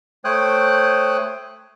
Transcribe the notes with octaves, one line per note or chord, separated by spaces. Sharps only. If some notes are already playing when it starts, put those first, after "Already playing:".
A3 C5 C#5 G5 D#6 F#6